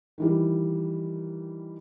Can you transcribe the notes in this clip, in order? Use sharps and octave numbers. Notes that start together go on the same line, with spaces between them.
D#3 E3 G3